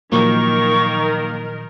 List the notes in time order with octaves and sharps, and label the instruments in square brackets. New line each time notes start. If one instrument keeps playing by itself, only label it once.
[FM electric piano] A#2 F3 F#3 [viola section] D#3 A#4 [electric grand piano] A#3 [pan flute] C#6